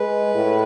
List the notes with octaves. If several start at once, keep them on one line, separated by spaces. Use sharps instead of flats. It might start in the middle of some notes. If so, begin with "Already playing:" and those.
Already playing: G#3 B4
A2